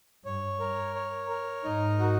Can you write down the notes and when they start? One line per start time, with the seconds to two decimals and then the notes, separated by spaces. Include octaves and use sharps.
0.24 G2 C#5
0.60 A#4
0.95 C#5
1.30 A#4
1.64 G#2 D#4
1.99 F#4